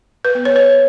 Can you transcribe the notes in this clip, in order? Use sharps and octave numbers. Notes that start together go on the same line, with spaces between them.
B4
B3
C#5
C#5